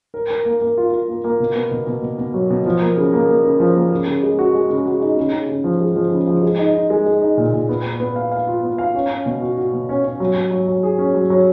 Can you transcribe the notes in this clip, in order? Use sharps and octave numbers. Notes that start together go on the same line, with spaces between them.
A#4
A#4
A#3
A#3
F4
F4
A#3
A#3
B2
B3
B2
B2
B2
B2
F#3
B2
F3
A#3
C#3
A#3
A#3
C#3
F3
A#3
C#3
C#3
G#3
F#4
G#3
C#3
F#4
D#4
C#3
C#3
C#3
F3
G#3
F3
C#3
F3
G#3
D#4
D#4
G#3
G#3
D#4
A#2
A#2
B3
B3
B3
F5
F5
F4
B3
F5
C#4
C#4
B2
F#4
F#4
B2
C#4
C#4
F#3
F#3
F#3
F#3
G#4
C#4
F#3
F#3